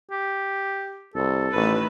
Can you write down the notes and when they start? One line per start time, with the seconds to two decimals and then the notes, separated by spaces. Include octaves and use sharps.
0.11 G4
1.15 C2 A4
1.54 A1 D#3 A3 B4